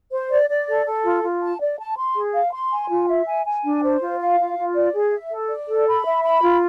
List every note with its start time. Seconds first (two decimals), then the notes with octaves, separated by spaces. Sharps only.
0.11 C5
0.30 D5
0.49 D5
0.68 A4
0.86 A4
1.04 F4
1.23 F4
1.42 A5
1.60 D5
1.79 A5
1.97 C6
2.16 G#4
2.34 F5
2.53 C6
2.72 G#5
2.90 F4
3.08 E5
3.27 G#5
3.45 G#5
3.64 D4
3.83 C5
4.01 F4
4.20 F5
4.39 F4
4.57 F4
4.75 D5
4.94 G#4
5.13 E5
5.31 A4
5.49 D5
5.69 A4
5.87 B5
6.05 E5
6.23 B5
6.42 F4